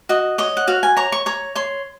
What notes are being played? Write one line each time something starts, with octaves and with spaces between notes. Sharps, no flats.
F#4 D#5
C#5 D#5
F#5
F#4 F5
G#5
C#5 A#5
C#6
C#5 A#5
C#5 C6